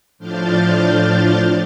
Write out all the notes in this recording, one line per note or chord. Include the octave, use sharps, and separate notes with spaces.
A2 F3 D4 F6 G6 A6